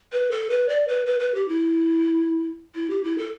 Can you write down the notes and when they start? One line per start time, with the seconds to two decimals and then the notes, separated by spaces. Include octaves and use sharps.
0.12 B4
0.31 A4
0.50 B4
0.69 D5
0.88 B4
1.06 B4
1.20 B4
1.35 G4
1.49 E4
2.75 E4
2.90 G4
3.04 E4
3.18 A4